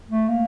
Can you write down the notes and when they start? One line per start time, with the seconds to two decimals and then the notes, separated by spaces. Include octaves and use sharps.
0.10 A3
0.28 A#3